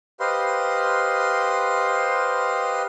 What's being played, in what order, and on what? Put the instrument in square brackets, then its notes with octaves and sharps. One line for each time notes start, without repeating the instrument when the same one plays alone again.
[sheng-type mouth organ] G4 B4 C5 D#5 F5 C6